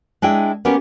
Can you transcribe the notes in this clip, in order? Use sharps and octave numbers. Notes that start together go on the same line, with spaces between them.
G#3 D4 E4 G#4 G5
A#3 B3 C#4 G4 A#4